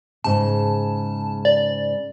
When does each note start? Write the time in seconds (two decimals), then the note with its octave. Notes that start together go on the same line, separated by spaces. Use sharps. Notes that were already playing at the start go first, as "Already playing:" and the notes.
0.24 G#2 C#3 A5
1.45 D5